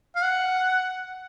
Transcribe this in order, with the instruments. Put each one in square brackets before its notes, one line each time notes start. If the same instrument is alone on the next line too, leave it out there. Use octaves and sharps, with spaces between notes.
[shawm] F5
F#5